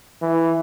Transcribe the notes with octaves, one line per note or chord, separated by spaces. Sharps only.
E3